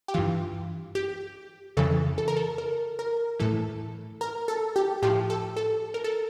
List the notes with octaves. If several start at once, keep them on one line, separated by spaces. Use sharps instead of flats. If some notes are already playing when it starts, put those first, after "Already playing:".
G4
G2 E3 F4
G4
F2 C#3 E3 A4
A4
A#4
A4
A#4
A#4
A2 E3 A4
A#4
A4
G4
A2 F3 G4
A4
A4
A#4
A4